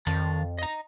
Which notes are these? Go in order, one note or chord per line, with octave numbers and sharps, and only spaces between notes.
F2 D#3 A5
D#5 A#5